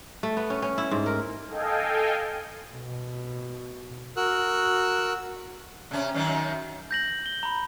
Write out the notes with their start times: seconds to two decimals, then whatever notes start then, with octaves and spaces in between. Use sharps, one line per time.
0.23 A3
0.37 B3
0.50 C#4
0.62 C#4
0.78 E4
0.91 G#2
1.06 A#4
1.49 A4 D#5 F5 G5 G#5
2.74 B2
4.17 F#4 A#4 E6 F#6
5.91 C3 C#4
6.14 F#2 D#3 F#3
6.91 G6 A#6 F#7
7.26 G7
7.43 A#5 B5